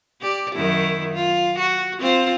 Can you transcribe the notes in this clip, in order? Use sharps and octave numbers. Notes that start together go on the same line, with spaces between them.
G4 D5
F#2 D#3 E4
F4
F#4
C4 F4 C5